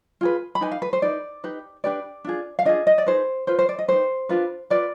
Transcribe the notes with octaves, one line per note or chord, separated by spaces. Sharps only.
F4 G#4 B4
B5
D#4 G4 B4 G#5
F5
B4
C5
D#4 B4 D5
D#4 G4 B4
D4 G4 B4 D5
D4 F4 G#4
F5
D4 F4 G#4 D#5
D#5
D5
D#4 G#4 B4 C5
F4 B4 C5
C5
D5
D#5
D#4 G4 B4 C5
D4 F4 B4
F4 B4 D5